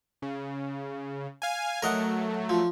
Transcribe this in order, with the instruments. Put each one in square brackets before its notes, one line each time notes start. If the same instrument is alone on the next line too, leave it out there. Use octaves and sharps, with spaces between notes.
[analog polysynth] C#3
F5 G#5
[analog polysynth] F#3 A3 [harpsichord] A#4 D#5 F#5
[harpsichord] F3